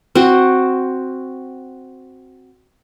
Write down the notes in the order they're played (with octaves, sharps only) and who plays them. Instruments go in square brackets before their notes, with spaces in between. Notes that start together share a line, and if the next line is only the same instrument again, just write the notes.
[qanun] C4 F#4